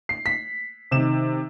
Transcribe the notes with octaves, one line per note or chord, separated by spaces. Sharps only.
C7
B6
C3 D#3 E7